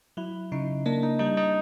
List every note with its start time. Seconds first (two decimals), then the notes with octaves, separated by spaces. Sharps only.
0.17 F#3 E4
0.52 C#3 D#4
0.86 A#3 D4
1.03 D#4
1.19 G3 D#4
1.37 D#4